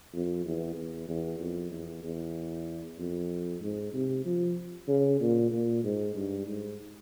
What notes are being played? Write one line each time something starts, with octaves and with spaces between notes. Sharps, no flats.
F2
E2
E2
E2
F2
E2
E2
F2
G#2
C3
F3
C#3
A#2
A#2
G#2
G2
G#2